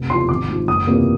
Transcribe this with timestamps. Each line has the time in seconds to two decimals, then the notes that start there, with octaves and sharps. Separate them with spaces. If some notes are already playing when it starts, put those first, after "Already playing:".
Already playing: F1
0.10 E2 C#3 F3 C6
0.29 G#1 D6
0.48 G#2 F3
0.68 F#1 D#6
0.87 E2 C3 F3 A#3